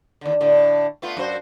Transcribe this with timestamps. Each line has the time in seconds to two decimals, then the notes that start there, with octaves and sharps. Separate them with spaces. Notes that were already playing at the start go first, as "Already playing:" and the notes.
0.21 D#2 D3
0.41 A2 D3
1.02 A3 B3 F4
1.17 F#2 F#4 C5